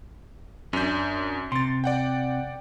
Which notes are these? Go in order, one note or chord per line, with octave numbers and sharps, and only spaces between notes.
F#2 C#4 D4 G6
C3 C6 A6
D5 F#5 G5